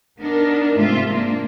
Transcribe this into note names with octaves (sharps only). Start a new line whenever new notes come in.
B3 D4 D#4 A#4
G#2 C3 G#3 A3 F4 E5
A#3 D4